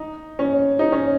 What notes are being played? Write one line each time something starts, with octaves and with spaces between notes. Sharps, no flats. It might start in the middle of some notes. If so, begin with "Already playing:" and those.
Already playing: D#4
C#4
D#4
C#4